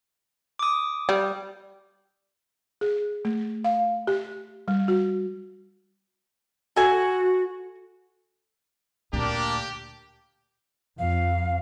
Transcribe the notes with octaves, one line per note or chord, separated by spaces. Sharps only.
D6 D#6
G3
G#4
A3
F5
G4
G3
F#4
F#4 A4 G#5
D2 A#2 A#3 D4 G4
F2 F5